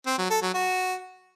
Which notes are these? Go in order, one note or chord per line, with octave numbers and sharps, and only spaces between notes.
C4
F#3
A4
F#3
F#4